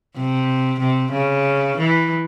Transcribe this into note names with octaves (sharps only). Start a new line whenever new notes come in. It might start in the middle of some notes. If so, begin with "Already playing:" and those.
C3
C3
C#3
E3